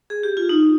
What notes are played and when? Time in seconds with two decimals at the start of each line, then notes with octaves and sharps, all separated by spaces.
0.10 G#4
0.23 G4
0.37 F4
0.49 D#4